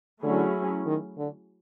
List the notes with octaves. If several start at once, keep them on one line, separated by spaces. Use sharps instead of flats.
D3 F#3 A3 C#4 E4 G#4
D#3
D3